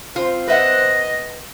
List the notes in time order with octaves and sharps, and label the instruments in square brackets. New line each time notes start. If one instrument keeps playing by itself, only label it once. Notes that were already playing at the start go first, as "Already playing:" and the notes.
[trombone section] C4 C5 [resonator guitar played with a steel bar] F4
[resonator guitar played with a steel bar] B4 E5 F#5 [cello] D#5